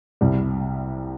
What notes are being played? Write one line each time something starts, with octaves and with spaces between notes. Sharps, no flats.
C2 C3 G3